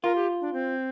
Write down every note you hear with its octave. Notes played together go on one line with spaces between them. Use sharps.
F4 A#4
G4
D4
C4